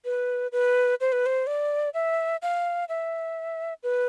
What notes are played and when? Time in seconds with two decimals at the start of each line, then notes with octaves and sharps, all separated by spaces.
0.05 B4
0.52 B4
1.00 C5
1.12 B4
1.26 C5
1.47 D5
1.94 E5
2.42 F5
2.89 E5
3.83 B4